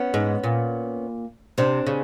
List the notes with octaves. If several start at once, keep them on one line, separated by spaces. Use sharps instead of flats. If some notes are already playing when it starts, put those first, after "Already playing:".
Already playing: B3 C#4
G#2
A#2
C3 C4 D4
C#3